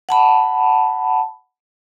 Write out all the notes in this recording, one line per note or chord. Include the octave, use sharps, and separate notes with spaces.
F#5 A5 B5